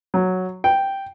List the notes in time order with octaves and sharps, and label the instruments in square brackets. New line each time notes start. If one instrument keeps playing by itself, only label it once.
[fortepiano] F#3
G5